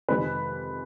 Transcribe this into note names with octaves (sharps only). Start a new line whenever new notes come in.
F2 C3 D#3 G#3 B4